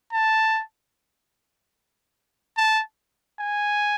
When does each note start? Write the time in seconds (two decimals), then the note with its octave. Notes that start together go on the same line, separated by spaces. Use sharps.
0.12 A5
2.57 A5
3.39 G#5